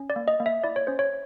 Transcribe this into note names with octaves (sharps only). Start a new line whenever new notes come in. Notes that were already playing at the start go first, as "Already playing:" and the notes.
Already playing: C#4
D5
A#3
D#5
A#3
E5
E4 D5
C#5
C#4 C5
C#5